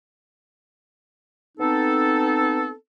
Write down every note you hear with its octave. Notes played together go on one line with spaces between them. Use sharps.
B3 C4 D#4 A4